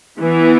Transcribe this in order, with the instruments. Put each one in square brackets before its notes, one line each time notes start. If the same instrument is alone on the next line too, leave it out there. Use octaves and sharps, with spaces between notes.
[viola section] E3 B3